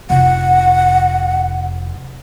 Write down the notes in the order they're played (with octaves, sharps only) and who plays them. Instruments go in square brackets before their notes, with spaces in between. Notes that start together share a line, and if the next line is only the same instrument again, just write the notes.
[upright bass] F1 [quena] F#5